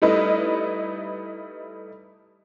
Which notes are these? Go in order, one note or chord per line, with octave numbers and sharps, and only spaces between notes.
G3 A3 D#4 E4 B4 D#5